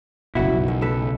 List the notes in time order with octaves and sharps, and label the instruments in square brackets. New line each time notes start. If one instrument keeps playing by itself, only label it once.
[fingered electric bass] F#1 B2 [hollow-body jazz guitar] E4 F#4
[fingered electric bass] B1
[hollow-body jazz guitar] F#2
C#2 A4 B4